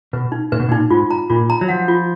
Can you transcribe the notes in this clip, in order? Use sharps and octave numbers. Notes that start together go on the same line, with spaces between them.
B2 B4
D#4
A#2 B4
B2
A#2
D#4
G#2 F4
A#5
A#2 F4
A#5
F#3
F3 F#5
F4